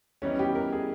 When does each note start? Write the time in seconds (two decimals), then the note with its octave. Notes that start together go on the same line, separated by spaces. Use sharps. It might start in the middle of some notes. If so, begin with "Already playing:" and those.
0.22 E3 G3 B3 C#4 D#4
0.39 G4
0.55 A#4
0.73 G#4